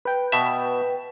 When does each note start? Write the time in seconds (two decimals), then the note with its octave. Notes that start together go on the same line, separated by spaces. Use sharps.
0.05 B4 G5
0.32 B2 E5